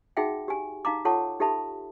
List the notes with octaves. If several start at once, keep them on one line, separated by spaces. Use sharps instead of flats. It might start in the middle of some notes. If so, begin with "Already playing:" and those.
D#4 F#4 G#4 E5 F#5 G5
G4 G#5
D#4 F5 A#5 D6
F4 A4 C#5 F#5 A5 C#6
D#4 G4 A4 E5 A5 B5